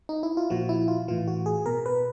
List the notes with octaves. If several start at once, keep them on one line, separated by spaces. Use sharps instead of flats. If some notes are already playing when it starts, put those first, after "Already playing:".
D#4
E4
F4
A#2 F3 F#4
E4
F4
A2 E3 F4
F#4
G#4
B2 A#4
B4